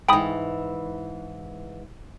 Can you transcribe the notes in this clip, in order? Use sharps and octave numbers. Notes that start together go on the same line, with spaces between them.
G#2 E3 G5 B5 D#6